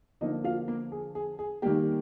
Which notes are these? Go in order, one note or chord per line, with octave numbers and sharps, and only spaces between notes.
D3 F3 A#3 D#4 D#5
F4 F5
A#3 A#4
G#4
G#4
G#4
D#3 G3 A#3 G4